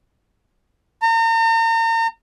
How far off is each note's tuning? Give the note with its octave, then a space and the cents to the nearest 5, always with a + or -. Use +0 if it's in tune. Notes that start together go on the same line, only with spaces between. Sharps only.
A#5 -40